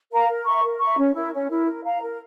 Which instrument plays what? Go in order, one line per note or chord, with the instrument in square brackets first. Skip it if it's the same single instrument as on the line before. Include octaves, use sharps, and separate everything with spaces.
[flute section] A#4 F5 A#5
A#4
E5 A#5 C#6
A#4
E5 A#5 C#6
C#4
E4 A#4
C#4
E4 A#4
A#4
F5 A#5
A#4